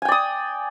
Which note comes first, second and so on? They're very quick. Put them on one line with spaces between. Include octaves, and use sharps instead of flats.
G#5 G5 D5 D#6